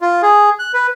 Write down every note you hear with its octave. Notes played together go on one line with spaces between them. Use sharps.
F4
G#4
F#6
B4